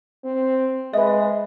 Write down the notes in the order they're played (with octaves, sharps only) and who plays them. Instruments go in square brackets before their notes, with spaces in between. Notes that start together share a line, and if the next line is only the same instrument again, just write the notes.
[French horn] C4
[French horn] G#3 [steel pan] B4 D#5 [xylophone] E5